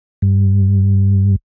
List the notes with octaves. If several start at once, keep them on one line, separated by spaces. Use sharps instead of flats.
G2